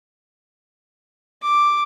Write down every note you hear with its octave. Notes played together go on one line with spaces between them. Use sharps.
D6